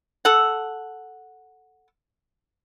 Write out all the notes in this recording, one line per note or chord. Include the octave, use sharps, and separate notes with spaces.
A4 F#5